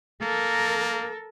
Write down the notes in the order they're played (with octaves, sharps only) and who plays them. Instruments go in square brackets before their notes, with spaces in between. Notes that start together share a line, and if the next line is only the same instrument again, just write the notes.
[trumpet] A#3 [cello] A4 A#4